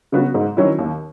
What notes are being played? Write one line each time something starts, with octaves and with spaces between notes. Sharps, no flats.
C#3 F#3 B3 F#4
G#2
D#3 F#3 C#4 E4
D#2